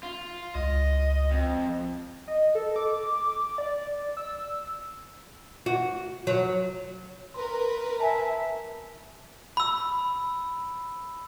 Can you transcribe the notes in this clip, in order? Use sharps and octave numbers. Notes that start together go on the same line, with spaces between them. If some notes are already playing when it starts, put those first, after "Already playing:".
F4
C#2 D#5
F2
D#5
A4
D6
D5
E6
F#4
F#3
A#4 B4 C6
E5 G#5 A5
B5 E6